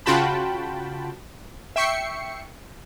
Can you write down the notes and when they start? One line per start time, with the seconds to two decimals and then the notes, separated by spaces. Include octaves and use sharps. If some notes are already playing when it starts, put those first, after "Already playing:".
0.06 C#3 F4 F#4 G5 A5 B5
1.76 E5 G5 C#6 C7 C#7